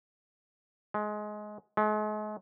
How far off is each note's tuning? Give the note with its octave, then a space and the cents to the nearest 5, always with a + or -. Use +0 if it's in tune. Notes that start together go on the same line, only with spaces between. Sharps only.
G#3 +20
G#3 +40